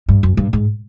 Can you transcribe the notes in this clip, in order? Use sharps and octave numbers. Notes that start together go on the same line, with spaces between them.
G2
F#2
G2
G#2